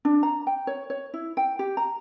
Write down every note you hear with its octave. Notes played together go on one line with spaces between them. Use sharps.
D4
A#5
G5
C#5
C#5
E4
G5
G4
A#5